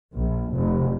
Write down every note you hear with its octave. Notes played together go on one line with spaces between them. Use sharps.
A#1
F1